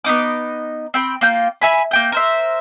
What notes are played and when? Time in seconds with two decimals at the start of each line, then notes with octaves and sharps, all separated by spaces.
0.05 B3 C4 D#4 D6
0.94 C4 G5 B5
1.21 A#3 F4 G5 G6
1.61 E5 G#5 B5
1.91 A#3 G5 G6
2.12 A#4 C5 E5